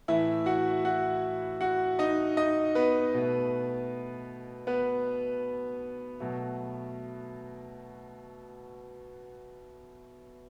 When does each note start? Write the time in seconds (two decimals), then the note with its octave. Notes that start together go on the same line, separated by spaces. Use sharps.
0.08 A2 E3 A3 E4 E5
0.46 F#4 F#5
0.85 F#4 F#5
1.61 F#4 F#5
1.99 D#4 D#5
2.37 D#4 D#5
2.75 B3 B4
3.14 B2 A3
4.67 B3 B4
6.20 B2 F#3 A3